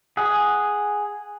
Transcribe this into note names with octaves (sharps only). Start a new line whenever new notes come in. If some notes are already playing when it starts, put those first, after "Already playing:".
G#4 F#5